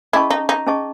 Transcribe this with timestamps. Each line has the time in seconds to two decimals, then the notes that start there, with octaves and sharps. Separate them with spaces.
0.13 C#4 E4 G#4 D#5 A5 C#6
0.30 D#4
0.49 D#4
0.66 C#4 G#4 D#5 A5 C#6